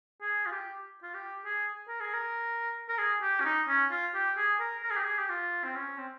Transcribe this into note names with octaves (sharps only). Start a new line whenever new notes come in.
G#4
F4
G4
F4
G4
G#4
A#4
G#4
A#4
A#4
G#4
G4
C#4
D#4
C#4
F4
G4
G#4
A#4
A#4
G#4
G4
G#4
G4
F4
C4
C#4
C4